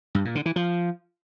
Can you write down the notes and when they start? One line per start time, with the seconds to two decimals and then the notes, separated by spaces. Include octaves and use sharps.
0.15 G2
0.25 A#2
0.35 D3
0.46 E3
0.56 F3